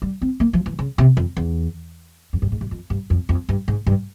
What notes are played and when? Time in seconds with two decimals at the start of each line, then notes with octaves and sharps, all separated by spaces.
0.02 G3
0.22 C4
0.40 A#3
0.53 F3
0.66 E3
0.79 C#3
0.98 C3
1.17 F2
1.37 E2
2.33 F2
2.42 G2
2.52 G#2
2.61 G2
2.71 F2
2.90 G2
3.10 F2
3.29 F2
3.49 G2
3.68 G#2
3.86 G2